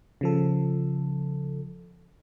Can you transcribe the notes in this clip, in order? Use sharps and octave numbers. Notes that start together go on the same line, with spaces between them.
C#3 F3 A4